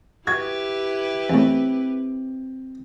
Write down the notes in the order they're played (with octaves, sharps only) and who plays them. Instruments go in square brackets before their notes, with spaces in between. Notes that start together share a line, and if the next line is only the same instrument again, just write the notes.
[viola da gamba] E4 G4 B4 [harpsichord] F#4 [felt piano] G#6
[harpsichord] E2 A2 [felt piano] C4